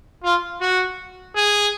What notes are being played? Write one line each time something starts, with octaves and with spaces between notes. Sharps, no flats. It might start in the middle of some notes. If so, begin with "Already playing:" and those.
F4
F#4
G#4